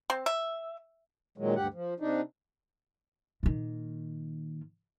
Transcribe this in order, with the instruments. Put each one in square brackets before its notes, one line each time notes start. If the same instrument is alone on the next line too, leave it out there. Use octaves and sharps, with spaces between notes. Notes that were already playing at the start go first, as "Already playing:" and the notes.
[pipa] C4
E5
[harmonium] A#2 D#3 F#3 G#3
D2 G2 G4 F#5
F3
C3 D4 D#4
[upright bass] A#2 D#3